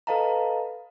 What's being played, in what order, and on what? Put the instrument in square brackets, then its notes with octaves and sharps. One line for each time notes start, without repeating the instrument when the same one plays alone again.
[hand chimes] A4 B4 D#5 F5 A5 A#5